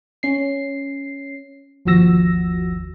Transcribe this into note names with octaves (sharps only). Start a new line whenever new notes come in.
C#4 C7
G1 D#2 F3 F#4 E6 A#6